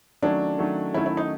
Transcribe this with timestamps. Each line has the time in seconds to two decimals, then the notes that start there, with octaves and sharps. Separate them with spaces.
0.22 D#3 F#3 A3 C#4 D4
0.58 D#3 F#3 A3 C#4
0.94 D#3 F#3 A3 C#4 E4
1.06 E4
1.17 D#4